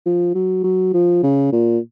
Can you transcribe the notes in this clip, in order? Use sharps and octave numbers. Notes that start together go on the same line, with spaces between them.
F3
F#3
F#3
F3
C#3
A#2